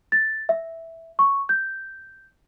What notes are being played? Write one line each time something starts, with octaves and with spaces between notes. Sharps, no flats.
A6
E5
C#6
G6